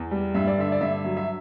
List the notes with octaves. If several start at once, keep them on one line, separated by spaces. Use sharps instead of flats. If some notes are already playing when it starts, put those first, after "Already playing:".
Already playing: E2
G3
G2 E5
D5
D3 E5
D5
G2 E5
F#3
E5